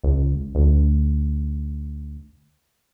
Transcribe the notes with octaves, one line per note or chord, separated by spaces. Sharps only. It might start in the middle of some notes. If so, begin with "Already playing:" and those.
C#2
D2